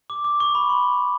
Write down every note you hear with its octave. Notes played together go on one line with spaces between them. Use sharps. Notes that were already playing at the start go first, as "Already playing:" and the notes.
D6
D6
C#6
B5
C6